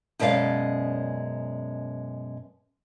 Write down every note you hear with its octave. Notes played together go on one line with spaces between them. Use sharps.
F#2 B2 G#3 C#4 D5 F5